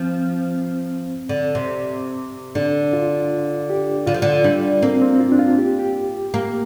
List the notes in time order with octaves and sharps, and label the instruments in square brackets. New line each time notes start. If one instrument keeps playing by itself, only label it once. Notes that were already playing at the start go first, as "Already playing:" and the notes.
Already playing: [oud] F3 [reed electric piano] C4
[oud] D3
C3
[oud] D3 [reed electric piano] D4
[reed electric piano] F4
G4
[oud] D3 [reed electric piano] F4
[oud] F3
D3
[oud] G3 [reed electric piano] D4
[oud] A#3 [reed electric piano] C4
[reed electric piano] C4
F4
D4
F4
G4
G4
[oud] A#3